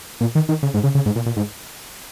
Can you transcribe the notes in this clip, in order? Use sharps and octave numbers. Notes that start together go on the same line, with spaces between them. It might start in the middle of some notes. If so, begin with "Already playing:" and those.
A#2
D#3
D#3
C#3
G#2
C#3
C#3
G#2
A#2
A#2
G#2